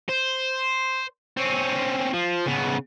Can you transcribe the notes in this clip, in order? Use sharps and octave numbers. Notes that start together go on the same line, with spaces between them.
C5
C4 C#4
F3
C#3 B3